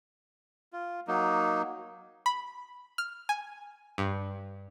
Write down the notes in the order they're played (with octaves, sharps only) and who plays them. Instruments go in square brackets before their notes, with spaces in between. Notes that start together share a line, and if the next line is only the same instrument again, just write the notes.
[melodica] F4
F#3 A#3 D#4
[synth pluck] B5
F6
G#5
G2